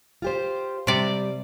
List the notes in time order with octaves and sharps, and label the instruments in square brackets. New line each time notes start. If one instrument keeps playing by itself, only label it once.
[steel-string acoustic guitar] F4 G4 C5
[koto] C3 D5 [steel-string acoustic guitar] G3